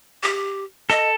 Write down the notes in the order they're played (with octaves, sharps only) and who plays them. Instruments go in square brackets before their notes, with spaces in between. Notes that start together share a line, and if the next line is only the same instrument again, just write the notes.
[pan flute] G4
[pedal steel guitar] A4 [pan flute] D#5